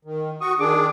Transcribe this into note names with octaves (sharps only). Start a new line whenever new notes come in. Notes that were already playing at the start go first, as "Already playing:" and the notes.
D#3
F#4 C#6 D#6
D#3 D4 G#4 D6